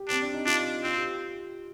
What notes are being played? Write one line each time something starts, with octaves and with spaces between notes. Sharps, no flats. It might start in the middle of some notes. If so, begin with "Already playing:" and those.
Already playing: G4
C4 D4
D4
D#4
D4 F4
C4 F4
G4